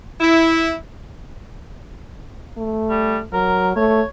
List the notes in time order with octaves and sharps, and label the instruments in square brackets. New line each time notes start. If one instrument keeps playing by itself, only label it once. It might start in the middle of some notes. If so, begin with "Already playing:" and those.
[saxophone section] E4
[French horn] A3
[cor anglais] G3
[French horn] F#3 [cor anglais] A#4
[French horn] A3 [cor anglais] C#5